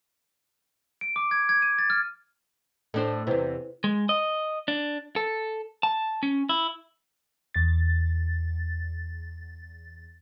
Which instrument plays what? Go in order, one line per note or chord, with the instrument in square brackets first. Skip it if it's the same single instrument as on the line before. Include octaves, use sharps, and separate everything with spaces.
[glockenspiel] D7
D6
G#6
G#6
D#7
A6
F6
[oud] A2 D4 C5 [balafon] A4
[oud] E2 C3 [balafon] E4 B4 C5
[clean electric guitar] G#3
D#5
D4
A4
A5
C#4
E4
[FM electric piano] E2 A6